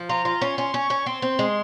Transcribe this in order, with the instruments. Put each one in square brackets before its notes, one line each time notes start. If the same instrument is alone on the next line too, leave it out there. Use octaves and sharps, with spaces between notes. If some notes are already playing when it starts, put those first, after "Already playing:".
Already playing: [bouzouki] F3
[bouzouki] F4 [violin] A#5
[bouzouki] F4
[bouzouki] C#4 [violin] C6
[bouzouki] C#4
[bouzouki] C#4 [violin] C#6
[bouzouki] C#4
[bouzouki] C4 [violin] C6
[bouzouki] C4
G#3